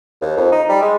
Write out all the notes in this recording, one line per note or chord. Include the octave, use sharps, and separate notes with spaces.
D#2
F2
D#4
G3
G#3